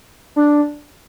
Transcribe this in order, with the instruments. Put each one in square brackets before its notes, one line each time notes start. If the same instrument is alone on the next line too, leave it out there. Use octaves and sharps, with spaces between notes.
[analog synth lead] D4